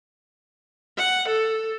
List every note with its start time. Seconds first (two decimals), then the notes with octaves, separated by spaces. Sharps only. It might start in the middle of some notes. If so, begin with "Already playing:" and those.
0.98 F#5
1.28 A4